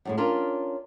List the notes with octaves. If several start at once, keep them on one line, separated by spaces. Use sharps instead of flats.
F#2 A2 G#3
C#4 D4 F4 A#4